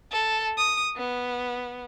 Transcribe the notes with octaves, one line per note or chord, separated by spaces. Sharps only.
A4
D#6
B3